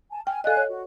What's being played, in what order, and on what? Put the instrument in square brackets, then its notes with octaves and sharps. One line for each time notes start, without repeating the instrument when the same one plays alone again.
[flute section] G#5 A5
[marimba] G5 [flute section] G#5 F6
[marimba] A4 D5 D#5 [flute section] F5 G#5 F#6
[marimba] C#5
[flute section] F#4